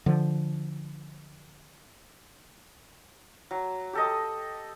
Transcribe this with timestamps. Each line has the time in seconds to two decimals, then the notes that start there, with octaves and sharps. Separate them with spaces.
0.06 D3 F3
3.51 F#3
3.93 G4 A4 D#5